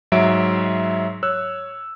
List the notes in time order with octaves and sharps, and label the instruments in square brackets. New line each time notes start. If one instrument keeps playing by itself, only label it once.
[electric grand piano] G#2 F#3 C#5 E5 D7
C#5 E6 F#6